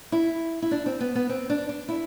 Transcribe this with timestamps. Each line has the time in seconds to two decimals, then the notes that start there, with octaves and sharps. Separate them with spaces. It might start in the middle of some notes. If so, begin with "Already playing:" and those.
0.12 E4
0.62 E4
0.71 D4
0.86 C4
1.00 B3
1.15 B3
1.29 C4
1.50 D4
1.69 D4
1.89 E4